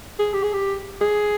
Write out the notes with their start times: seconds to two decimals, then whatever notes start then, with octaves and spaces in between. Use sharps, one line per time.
0.19 G#4
0.34 G4
0.44 G#4
0.53 G4
1.02 G#4